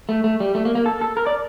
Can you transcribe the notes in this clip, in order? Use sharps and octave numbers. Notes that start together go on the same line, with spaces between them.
A3
A3
G3
A3
A#3
A#3
A4
A4
A#4
D5